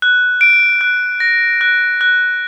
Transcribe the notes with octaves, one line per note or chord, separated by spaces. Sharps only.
F#6
D7
F#6
A#6
F#6
F#6